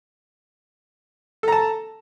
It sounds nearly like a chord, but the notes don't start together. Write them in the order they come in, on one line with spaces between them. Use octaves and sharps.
A4 A#5 A5